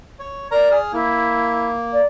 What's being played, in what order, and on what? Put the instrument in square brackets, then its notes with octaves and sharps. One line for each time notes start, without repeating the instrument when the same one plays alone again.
[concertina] C#5
[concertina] A#4 A#5 [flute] D5
[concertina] G#4 F6
[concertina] A#3 [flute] E4
[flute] D5